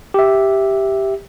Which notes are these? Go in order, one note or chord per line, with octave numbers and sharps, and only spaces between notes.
G4 E5